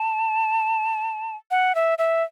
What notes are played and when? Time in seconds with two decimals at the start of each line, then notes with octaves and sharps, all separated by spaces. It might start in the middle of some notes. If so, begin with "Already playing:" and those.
Already playing: A5
1.51 F#5
1.75 E5
1.98 E5